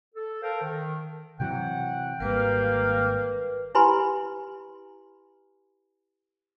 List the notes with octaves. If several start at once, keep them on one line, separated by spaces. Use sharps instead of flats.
A4
A4 A#4 C5 F5 G5 A5
D#3
C3 E3 F#3 F#5 G5
G#1 G3 A#3 A#4 B4 F5
E4 G4 B4 G#5 B5 C6